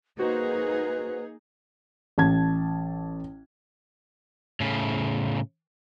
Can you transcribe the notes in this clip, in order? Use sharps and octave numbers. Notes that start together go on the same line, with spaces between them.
A#3 D#4 F#4 G#4 B4 C5
A1 A5 G#6
A2 C#3